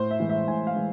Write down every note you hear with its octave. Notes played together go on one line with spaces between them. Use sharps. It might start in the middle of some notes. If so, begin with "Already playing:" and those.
Already playing: A2 C5
E5
E3 G#3
E5
A2 G#5
F5
E3 G#3